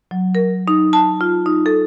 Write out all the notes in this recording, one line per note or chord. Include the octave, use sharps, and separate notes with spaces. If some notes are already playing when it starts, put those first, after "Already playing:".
F#3
A#4
D#4
A5
F4
D#4
A4